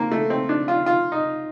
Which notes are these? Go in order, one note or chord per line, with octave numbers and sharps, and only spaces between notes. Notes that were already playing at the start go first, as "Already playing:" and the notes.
Already playing: A#3 C4
A3
C4
D4
F4
F4
D#4